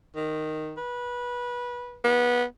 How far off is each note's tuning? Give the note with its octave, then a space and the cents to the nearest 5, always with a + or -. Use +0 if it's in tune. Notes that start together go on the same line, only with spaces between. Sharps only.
D#3 -5
B4 -20
B3 -20